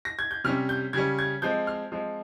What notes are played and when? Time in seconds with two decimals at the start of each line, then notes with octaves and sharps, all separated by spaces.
0.05 A#6
0.19 G#6
0.31 G6
0.44 C3 G3 C#4 F6
0.69 G6
0.93 C#3 G3 C#4 G#6
1.19 G#6
1.42 F3 G#3 C4 G6
1.67 F6
1.92 F3 G#3 C4